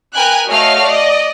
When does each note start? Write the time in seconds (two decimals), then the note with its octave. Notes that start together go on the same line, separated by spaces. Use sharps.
0.14 A#4 B4 G5 G#5 F#6
0.49 A3 F#4 C#5 D#5 F5 F6
0.85 D5 D#5